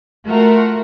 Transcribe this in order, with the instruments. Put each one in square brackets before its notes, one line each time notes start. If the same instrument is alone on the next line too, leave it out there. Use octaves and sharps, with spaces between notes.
[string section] A3 F4 F#4 A#4